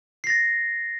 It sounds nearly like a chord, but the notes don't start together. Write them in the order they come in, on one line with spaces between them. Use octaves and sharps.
C7 A#6 A6